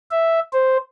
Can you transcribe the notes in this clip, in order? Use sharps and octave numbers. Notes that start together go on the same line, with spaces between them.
E5
C5